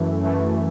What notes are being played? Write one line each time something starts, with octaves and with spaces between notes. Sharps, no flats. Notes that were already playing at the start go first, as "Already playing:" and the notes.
Already playing: F#2 E3 A3
F#2 E3 A3